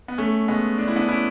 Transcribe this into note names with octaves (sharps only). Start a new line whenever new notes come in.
B3
A3 C#4
G#3 B3
D4
E4
B3 D4
C#4 E4